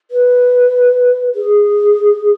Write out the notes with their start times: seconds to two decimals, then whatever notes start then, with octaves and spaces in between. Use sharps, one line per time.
0.11 B4
1.35 G#4